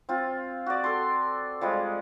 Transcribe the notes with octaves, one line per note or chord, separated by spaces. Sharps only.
C4 F4
F#4 D5
A4 C6
F3 G3 G#3